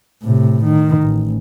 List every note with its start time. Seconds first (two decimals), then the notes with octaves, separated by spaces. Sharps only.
0.23 A2 C3
0.64 D#3
1.03 A1